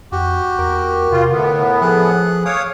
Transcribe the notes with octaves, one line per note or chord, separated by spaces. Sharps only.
F2 F#4 G4
E2 A#4
C3 F4
A2 D3 B3
F3 G#4 A4 F#6
C#5 F5 D6 D#6